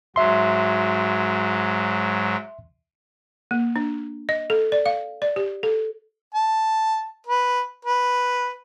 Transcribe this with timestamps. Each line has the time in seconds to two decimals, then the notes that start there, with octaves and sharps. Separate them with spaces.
0.16 G#2 F#3 E5 C6
3.51 A#3
3.76 D4
4.29 D#5
4.50 A4
4.72 D5
4.86 F5
5.22 D5
5.36 G4
5.63 A4
6.34 A5
7.27 B4
7.85 B4